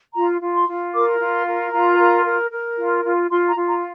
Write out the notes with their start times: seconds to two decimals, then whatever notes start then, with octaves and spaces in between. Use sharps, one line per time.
0.15 F4 A#5
0.41 F4
0.54 C6
0.68 F4
0.94 A#4 D6
1.20 F4
1.33 C6
1.46 A#4
1.72 F4 A#5
1.99 A#4
2.24 A#4
2.50 A#4
2.77 F4
3.03 F4
3.30 F4 C6
3.48 A#5
3.55 F4
3.69 A#5